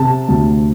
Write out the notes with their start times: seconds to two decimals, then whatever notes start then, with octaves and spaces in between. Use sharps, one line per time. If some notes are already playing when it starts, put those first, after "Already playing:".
Already playing: C3 A5
0.28 D2